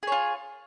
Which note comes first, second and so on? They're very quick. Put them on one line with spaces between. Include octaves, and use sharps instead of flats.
G#4 C#5 F4